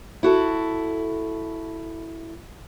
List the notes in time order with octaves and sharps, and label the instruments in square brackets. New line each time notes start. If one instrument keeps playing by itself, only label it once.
[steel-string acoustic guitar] E4 F#4 A4